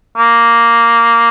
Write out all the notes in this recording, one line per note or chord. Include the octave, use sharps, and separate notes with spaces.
A#3